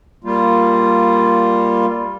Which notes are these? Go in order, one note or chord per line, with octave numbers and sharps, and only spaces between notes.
G3 A#3 F4